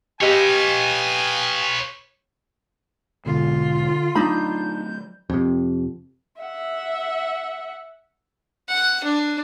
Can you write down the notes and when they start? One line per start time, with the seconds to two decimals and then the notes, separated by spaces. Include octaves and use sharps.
0.21 G4 B4 C#5 D#5 F5 G5 G#5 E6
3.26 B1 G#2 B2 D3 F4
4.15 F#3 A3 D4 D#4 B5 G6
5.30 F2 C3
6.41 E5 F#5
8.69 F#5
9.04 D4